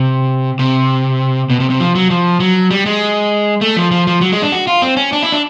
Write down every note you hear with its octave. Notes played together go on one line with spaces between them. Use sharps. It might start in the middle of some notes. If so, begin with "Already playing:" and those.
Already playing: C3
C3
B2
C3
C3
F3
F#3
F3
F#3
G3
G#3
A3
F3
F3
F3
F#3
G#3
D4
F#4
F4
C4
C#4
D4
E4
D4